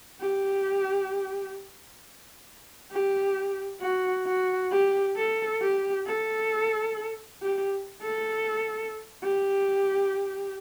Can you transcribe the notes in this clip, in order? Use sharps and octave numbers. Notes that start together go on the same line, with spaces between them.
G4
G4
F#4
F#4
G4
A4
G4
A4
G4
A4
G4